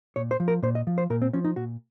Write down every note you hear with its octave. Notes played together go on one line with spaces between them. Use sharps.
A#2 C#5
C5
F3
A#4
A#2 C5
D#5
F3
C5
A#2 A#4
C4
F3 C#4
D#4
A#2 F#4